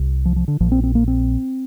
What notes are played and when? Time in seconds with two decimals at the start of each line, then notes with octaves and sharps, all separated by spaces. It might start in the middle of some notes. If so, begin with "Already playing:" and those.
Already playing: C2 C3
0.25 F3
0.36 F3
0.48 D3
0.60 A#1 A#2 F3
0.72 C4
0.84 C4
0.95 A#3
1.08 C4